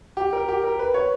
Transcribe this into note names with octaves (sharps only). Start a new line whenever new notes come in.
G4
A#4
G4
A#4
B4
C#5